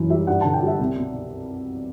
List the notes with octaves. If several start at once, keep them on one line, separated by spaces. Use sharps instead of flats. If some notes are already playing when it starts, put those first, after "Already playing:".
Already playing: F#2 E3
G3 E5
G2 F#5
D3 A5
G5
G3 E5
C2
B2